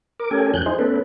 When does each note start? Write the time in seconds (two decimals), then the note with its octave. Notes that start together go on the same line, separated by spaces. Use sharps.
0.20 A#4 D6
0.31 A3 C#4 G4 A4 A#4 G#5
0.54 F2 F3 F#6 G6
0.66 D#4 E4 G#4 C5
0.79 A3 B3 C#4 A4 B4